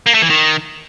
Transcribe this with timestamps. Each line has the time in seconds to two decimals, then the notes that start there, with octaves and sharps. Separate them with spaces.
0.06 A#3
0.14 A3
0.22 E3
0.30 D#3